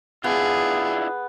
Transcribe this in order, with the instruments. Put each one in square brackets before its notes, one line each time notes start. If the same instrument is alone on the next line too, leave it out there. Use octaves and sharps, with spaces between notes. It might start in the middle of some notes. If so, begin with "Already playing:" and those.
[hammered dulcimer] B3 [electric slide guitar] D4 E4 F4 [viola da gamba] G#4